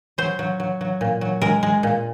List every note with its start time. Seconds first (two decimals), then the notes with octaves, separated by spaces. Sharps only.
0.18 F#3 C5
0.39 F#3
0.60 F#3
0.81 F#3
1.01 A#2
1.21 F#3
1.42 G#3 A#4
1.63 G#3
1.83 A#2